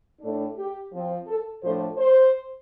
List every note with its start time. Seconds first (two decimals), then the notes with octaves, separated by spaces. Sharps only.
0.21 A2 A3 D4
0.56 G4
0.91 F3 C4
1.27 A4
1.62 A2 F3 A3 D4 C5
1.97 C5